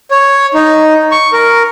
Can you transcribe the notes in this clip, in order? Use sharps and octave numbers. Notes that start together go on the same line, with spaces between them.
C#5
D#4
C#6
A#4